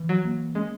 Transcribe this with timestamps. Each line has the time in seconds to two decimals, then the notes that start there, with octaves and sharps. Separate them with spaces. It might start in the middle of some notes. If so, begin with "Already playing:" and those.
Already playing: E3
0.09 F#3
0.25 A#3
0.55 G#3 C#4